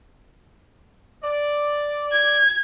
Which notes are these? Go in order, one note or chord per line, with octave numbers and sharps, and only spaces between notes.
D5
G#6